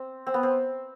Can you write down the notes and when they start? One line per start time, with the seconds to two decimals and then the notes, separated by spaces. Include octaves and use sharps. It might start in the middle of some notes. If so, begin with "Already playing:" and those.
Already playing: C4
0.27 C4
0.34 B3
0.43 C4